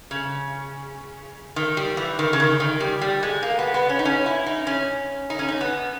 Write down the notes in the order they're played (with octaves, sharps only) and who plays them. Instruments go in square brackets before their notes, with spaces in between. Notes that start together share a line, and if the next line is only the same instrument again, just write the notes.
[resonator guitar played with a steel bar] C#3
D#3
G3
E3
D#3
C#3
D#3
D#3
G3
G3
G#3
A#3
B3
B3
C#4
D#4
C#4
E4
D#4
C#4
D#4
C#4
D#4
B3